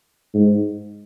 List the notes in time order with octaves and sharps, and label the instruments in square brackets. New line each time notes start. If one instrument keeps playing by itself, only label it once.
[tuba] G#2